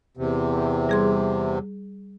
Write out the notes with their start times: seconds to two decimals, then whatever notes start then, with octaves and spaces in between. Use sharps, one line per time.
0.17 E2 C3
0.89 G3 G#4 C6